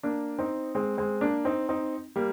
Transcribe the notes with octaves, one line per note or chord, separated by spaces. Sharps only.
A#3 D4
C4 D#4
G#3 C4
G#3 C4
A#3 D4
C4 D#4
C4 D#4
G3 A#3